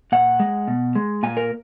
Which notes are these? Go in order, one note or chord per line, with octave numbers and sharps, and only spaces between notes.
A#2 F#5
G#3
B2
G#3
A#2 G#5
A#4